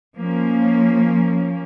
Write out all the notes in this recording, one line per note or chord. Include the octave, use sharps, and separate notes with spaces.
F3 A#3 C#4